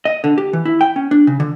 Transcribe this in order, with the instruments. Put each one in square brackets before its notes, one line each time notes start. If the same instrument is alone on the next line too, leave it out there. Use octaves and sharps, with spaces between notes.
[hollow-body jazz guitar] D#5
D3
G4
E3
E4
G5
C#4
D4
C#3
D3